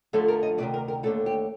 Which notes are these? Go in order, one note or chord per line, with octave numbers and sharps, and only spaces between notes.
F2 D3 F3 A3 A4
A#4
D#5
D2 C3 D#3 D5
A#4
A#4
D#2 D3 A3 A4
G4